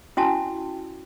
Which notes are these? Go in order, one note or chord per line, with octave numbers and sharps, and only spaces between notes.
C#4 E4 F#4 G#5 A5